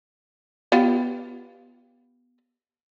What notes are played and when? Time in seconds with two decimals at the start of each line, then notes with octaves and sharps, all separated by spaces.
0.72 B3 F4 G4